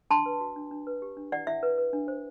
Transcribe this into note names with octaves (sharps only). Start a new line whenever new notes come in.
D4 A5 C6
B4
F#4
D4
D4
B4
G4
D4
E4 D5 F#5
E4 E5
B4
B4
D4
C5